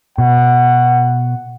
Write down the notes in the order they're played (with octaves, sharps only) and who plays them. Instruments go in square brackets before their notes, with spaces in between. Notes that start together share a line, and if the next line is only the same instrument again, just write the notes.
[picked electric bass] B2 [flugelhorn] F#5